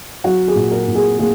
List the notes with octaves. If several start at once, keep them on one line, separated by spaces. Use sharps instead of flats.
F#3 F#4
G#4
A#2
A#4
A#2
G#4
A#3 G#4